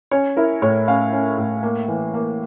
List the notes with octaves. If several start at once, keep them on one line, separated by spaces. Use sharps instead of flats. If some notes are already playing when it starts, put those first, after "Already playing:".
C#4 C#5
E4 A#4
A2 C#5
C#4 F5
C#4
A2
A#3
E3
A#3